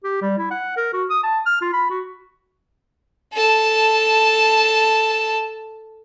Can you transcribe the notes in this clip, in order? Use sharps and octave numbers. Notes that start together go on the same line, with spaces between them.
G4
G3
E4
F#5
A#4
F#4
D#6
A5
F6
F4
B5
F#4
A4 A5